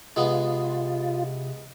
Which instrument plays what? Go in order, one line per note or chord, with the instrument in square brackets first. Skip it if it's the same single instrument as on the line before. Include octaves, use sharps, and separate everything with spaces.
[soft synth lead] C3 [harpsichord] G#3 B3 [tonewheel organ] F4